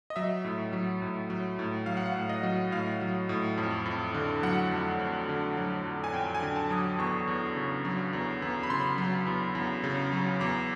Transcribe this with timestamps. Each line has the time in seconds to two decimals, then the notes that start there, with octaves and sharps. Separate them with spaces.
0.10 D#5
0.16 F#3 E5
0.44 A2
0.73 F#3
1.02 A2
1.30 F#3
1.59 A2
1.86 F#3 F5
1.97 F#5
2.06 F5
2.16 A2
2.29 D#5
2.43 F#3
2.72 A2 F5
3.01 F#3
3.29 A2
3.58 F2
3.86 F2
4.14 D3
4.43 F#3 F#5
4.71 F2
5.00 F2
5.29 D3
5.57 F#3
5.85 F2
6.04 G#5
6.13 F2 G5
6.35 G#5
6.42 D3
6.56 A5
6.70 F#3 D#6
6.78 D6
6.99 E2 C#6
7.28 E2
7.56 C#3
7.85 F#3
8.13 E2
8.42 E2
8.63 B5
8.70 C#3 C6
8.98 F#3
9.27 E2
9.55 E2
9.84 C#3
10.13 F#3
10.40 E2 D6